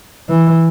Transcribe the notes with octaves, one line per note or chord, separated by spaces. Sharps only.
E3